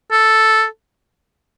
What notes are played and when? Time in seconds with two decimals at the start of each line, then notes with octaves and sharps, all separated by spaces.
0.11 A4